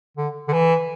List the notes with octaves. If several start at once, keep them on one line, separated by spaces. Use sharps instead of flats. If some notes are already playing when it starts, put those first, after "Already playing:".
D3
D3
E3